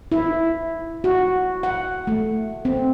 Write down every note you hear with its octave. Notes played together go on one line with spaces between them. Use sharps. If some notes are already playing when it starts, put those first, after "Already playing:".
E4
F#4
F#5
A3
C4